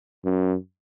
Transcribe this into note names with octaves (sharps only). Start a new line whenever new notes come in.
F#2